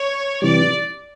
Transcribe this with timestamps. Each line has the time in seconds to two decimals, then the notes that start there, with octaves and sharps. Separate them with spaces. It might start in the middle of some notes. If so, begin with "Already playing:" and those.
Already playing: C#5
0.42 C3 E3 G3 D5